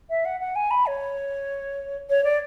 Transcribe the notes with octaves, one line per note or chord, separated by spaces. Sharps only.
E5
F#5
F#5
G#5
B5
C#5
C#5
D5